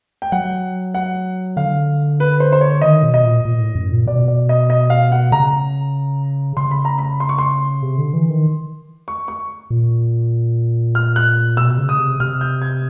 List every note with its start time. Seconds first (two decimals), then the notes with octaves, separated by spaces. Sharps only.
0.22 G5
0.32 F#3 F#5
0.94 F#5
1.56 D3 F5
2.20 B4
2.40 C5
2.53 C5
2.61 C#5
2.81 D#3 D#5
3.03 B2
3.14 D#5
3.24 A#2
3.45 A#2
3.60 A2
3.75 F#2
3.92 A#2
4.07 B2 D5
4.28 D5
4.49 D#5
4.70 D#5
4.90 F5
5.12 F#5
5.32 C#3 A#5
6.57 C#3 C6
6.71 B5
6.85 A#5
6.98 B5
7.20 C6
7.29 C#6
7.38 C6
7.82 C3
7.98 D3
8.14 E3
8.30 D#3
9.08 C#6
9.28 C#6
9.70 A#2
10.95 F6
11.16 F#6
11.57 B2 E6
11.78 C#3
11.89 D#6
11.99 C3
12.20 C3 F6
12.41 G6
12.62 G#6